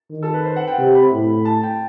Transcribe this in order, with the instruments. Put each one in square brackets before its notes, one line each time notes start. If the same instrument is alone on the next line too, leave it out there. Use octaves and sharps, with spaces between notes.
[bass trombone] D#3
[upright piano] A4
B4
C5
F#5
G5
[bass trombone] C3
[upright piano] B5
[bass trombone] A2
[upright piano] A5
G5